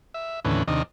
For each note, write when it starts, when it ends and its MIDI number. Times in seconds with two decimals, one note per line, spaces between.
0.14 0.40 76
0.45 0.63 39
0.45 0.63 45
0.45 0.63 50
0.45 0.63 52
0.45 0.63 61
0.45 0.63 71
0.68 0.83 39
0.68 0.83 48
0.68 0.83 51
0.68 0.83 62
0.68 0.83 75